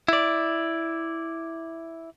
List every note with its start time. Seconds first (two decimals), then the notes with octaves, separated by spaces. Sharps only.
0.08 E4 D5